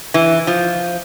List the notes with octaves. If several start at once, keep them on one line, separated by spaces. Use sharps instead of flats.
E3
F3